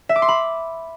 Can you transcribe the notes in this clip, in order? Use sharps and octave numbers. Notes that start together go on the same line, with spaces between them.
E5
D6
C6
B5